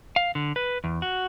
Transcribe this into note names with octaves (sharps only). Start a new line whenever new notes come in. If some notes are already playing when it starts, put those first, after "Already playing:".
F5
D3
B4
E2
F#4